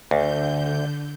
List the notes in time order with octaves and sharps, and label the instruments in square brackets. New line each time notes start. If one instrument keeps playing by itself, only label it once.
[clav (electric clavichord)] D2 [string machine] D3 G6